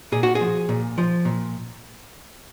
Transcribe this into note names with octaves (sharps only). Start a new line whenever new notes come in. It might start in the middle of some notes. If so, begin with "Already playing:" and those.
A#2 G#4
F#4
G#4
F3
A#2
F3
A#2